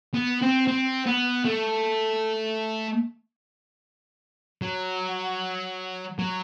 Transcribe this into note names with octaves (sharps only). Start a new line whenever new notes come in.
B3
C4
C4
B3
A3
F#3
F#3